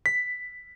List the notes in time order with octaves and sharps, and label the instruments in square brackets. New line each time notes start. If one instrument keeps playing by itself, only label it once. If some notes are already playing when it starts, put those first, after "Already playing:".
[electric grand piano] B6